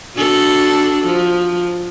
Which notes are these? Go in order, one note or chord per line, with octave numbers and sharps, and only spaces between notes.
D4 F#4 A4
F3